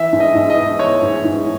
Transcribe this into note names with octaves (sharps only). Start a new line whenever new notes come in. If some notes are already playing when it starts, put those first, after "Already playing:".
Already playing: E3 E5
G#2
D#5
G#2
D#5
B3
E3 C#5
G#2
G#2